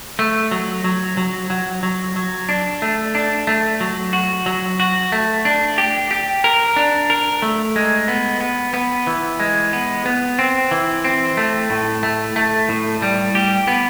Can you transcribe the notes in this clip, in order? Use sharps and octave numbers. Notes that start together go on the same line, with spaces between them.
A3
F#3
F#3
F#3
F#3
F#3
F#3
D4
A3
D4
A3
F#3
F#4
F#3
F#4
A3
D4
G4
G4
A#4
D4
A#4
A3
G#3
B3
B3
B3
E3
G#3
B3
B3
C4
E3
C4
A3
A2
A3
A3
A2
G3
G4
B3